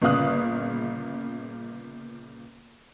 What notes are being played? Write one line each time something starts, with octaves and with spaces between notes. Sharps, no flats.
G1 A#2 C#3 F5 D#6 F#6